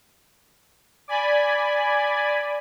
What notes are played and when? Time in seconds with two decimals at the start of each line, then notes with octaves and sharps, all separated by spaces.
1.08 D5 G#5 B5